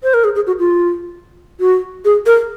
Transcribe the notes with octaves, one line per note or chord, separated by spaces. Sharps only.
C5
A#4
G#4
G#4
F#4
F4
F#4
G#4
A#4